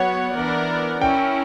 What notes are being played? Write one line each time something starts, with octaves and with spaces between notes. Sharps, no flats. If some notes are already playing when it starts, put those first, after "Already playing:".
Already playing: F#3 B3 F#4 C#5 F#5
E3 B3 D4 A#4 D5
C#4 E4 A#4 G5